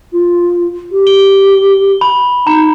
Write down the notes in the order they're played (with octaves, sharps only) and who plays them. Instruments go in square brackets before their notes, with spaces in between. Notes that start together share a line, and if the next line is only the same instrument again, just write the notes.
[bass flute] F4
G4
[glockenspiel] G7
B5
[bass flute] D#4 [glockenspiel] A#5